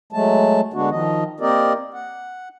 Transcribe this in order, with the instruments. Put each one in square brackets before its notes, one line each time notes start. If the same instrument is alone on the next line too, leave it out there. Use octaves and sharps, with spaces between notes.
[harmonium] F#3 G#3 A3 A5
D3 G#3 B3 D4 F#4
D#3 F3 D#5
A#3 C4 G4 A#4 D5 D#5
F#5